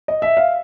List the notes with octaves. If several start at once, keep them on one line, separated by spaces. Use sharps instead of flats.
D#5
E5
F5